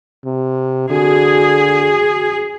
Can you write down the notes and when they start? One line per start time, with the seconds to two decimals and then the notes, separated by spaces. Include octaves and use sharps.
0.25 C3
0.90 D3 F#4 G#4